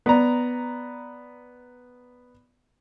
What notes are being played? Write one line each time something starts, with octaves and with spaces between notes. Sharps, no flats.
B3 D5 A#5